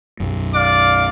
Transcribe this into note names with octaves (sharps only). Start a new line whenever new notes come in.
B1 F#2
D5 F5 D6